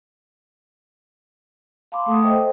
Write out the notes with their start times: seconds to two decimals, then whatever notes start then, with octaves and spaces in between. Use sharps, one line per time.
1.92 F5 A5 B5 C6 D6
2.06 A3 A4 F#5 D#6
2.22 A4 C5 D#5 E5 G5